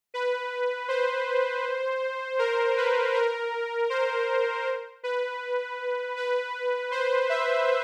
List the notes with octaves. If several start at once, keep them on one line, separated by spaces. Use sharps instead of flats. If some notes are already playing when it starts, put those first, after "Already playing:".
B4
C5
A#4
B4
A#4
C5
B4
B4
C5
E5